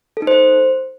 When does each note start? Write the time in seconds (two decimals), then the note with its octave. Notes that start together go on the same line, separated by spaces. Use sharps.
0.17 A4
0.22 D#4
0.27 C5